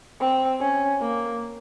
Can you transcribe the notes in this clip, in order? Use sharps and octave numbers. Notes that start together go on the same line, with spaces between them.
C4
C#4
A#3